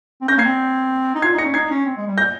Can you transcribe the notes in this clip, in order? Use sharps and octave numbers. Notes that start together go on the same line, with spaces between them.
C4
C#4 G6 A#6
A#3 G#6 C7
C4
D#4
F4 G#6 C7
D#4 A#6 C#7
C#4
D#4 G#6 C7
C#4
C4
G#3
G3
G6 A#6